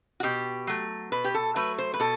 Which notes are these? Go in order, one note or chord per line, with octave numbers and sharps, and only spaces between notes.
F#4
B2 G4
F#3 A3
B2 B4
G4
A4
F#3 A3 B4
C5
B4
B2 A4